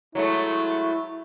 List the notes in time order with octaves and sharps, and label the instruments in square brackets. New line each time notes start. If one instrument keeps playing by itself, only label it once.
[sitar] F#3 G#3 A3 [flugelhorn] E4